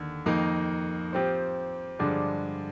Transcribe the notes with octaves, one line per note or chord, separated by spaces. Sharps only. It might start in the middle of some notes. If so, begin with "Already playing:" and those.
Already playing: D#2 D3
F2 D#3 A#3 D#4
F3 C4 G4 C5
G2 D3 F3 G#3 D4